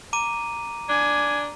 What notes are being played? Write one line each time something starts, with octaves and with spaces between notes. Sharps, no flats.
A#5 D6 D#7
D4 G#5